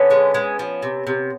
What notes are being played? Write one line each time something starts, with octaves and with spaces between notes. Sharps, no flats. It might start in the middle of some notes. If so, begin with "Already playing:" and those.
Already playing: D3 B3 C#4
G#3
G#3
F3
C3
C3